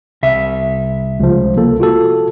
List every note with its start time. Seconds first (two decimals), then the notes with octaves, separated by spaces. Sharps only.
0.23 C2 E5
1.20 C#2 F3
1.57 A#3 A4
1.80 F4 F#4 A4